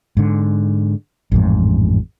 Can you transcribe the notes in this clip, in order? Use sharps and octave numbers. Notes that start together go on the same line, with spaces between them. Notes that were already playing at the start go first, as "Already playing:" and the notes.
G#2 D3
A1 F2 G#2